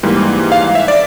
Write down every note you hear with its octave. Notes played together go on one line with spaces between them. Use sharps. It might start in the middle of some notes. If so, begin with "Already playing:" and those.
G#2 E3 G3 A#3
F5
E5
D5